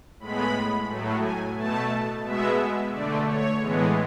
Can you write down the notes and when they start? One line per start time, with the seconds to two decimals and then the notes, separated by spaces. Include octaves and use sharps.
0.20 A2 G#3 B3 B5
0.88 A2 F#3 A3
1.21 G#5
1.56 B2 A3 A5
2.24 B2 G#3 B3 E5
2.92 D3 A3 D5
3.26 C#5
3.60 A2 E3 G#3 B3